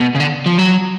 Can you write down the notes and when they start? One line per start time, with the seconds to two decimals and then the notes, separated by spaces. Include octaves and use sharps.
0.01 B2
0.15 C#3
0.20 D3
0.46 F3
0.58 F#3